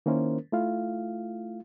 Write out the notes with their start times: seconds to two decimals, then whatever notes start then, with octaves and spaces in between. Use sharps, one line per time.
0.06 D#3 A#3 C#4 E4 A#4 C5
0.52 A3 E4 F4 F5